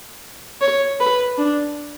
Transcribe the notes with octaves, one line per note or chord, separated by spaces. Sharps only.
C#5
B4
D4